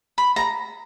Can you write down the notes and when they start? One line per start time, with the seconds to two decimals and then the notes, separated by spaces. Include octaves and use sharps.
0.18 B5
0.36 A#5